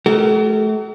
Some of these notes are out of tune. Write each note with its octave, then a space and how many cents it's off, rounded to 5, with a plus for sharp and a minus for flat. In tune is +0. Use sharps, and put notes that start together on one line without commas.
A3 -35 F#4 +45 A#4 -30